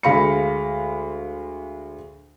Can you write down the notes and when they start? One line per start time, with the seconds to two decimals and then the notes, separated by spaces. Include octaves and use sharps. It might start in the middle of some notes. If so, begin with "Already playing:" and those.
0.03 D2 G#3 F5 B5 A#6 C#7